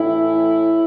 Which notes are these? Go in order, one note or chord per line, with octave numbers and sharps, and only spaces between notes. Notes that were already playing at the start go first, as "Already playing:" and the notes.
Already playing: A2 E3 E4